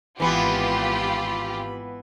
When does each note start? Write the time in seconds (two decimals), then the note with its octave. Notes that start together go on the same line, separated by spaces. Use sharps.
0.20 G#1 E3 B3 F4 G4 B5